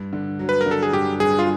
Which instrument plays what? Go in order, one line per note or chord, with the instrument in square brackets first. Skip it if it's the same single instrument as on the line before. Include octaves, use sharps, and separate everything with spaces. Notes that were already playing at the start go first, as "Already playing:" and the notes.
Already playing: [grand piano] G2
D3
F#3
[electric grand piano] B4
A#4
[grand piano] D3
[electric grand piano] A4
G#4
[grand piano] G2 [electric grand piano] G4
[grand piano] G2 [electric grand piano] G#4
[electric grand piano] F4